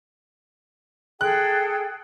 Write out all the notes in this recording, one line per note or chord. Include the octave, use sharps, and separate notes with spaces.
G#4 A4 G5 F#6